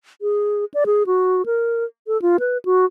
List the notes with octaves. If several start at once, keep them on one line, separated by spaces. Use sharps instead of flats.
G#4
D5
G#4
F#4
A#4
A4
F4
B4
F#4